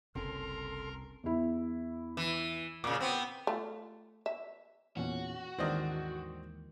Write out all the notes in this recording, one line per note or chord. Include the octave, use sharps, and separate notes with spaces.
F#1 C2 C4 C#4 A4 A#4 A#5 C6
E2 E4
E3
A#2 C#3 D6
B3 C4
A3 F4
E5
E2 A#2 C#4 F#4
D#2 G#2 E3 C4 D4 A#4 D#5